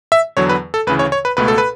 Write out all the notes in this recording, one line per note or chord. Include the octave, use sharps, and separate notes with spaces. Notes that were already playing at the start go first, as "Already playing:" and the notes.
E5
E2 D3 F#3 C#5
B4
A4
D2 C#3 E3 B4
C#5
C#5
B4
C#2 B2 A3 B4
A4
B4